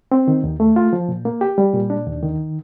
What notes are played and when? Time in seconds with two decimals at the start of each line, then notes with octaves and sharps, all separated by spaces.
0.12 C4
0.28 D#3
0.44 D#2
0.60 A3
0.76 F4
0.93 F3
1.09 A#2
1.25 A#3
1.41 G4
1.58 G3
1.74 A#2
1.90 D4
2.06 D#2
2.23 D#3